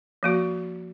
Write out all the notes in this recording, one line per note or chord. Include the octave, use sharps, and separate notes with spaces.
F3 A#3 F#4